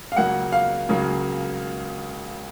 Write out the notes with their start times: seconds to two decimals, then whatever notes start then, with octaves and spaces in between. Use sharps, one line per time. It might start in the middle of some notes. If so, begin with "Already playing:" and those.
0.12 F5
0.17 C#2 C#3 F#3 A#3 F#5
0.52 F5
0.89 C#2 C#3 F#3 A#3